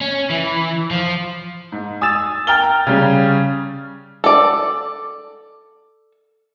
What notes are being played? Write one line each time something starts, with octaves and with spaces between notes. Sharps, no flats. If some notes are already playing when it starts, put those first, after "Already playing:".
C#4
E3
F3
G#2
G#5 D#6 E6 A6 E7
G5 A#5 F6 A6 G7
C#3 G3 C#4
A4 D5